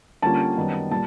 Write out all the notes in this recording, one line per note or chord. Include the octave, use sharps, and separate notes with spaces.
D3 G3 A#3 C#4 F4 A5
F#2 D#3 G3 B3
A#2 G3 A5